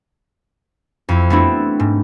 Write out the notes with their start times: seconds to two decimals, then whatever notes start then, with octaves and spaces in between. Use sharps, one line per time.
1.09 F2 E4
1.30 A3 B3 C4 D4 E4 F#4
1.80 G#2